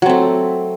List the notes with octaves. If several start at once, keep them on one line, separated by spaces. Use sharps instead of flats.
F#3 A3 C4